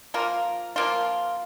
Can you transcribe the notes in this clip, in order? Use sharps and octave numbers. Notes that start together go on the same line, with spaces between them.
F3 A#3 F4 A#4
F3 A#3 F4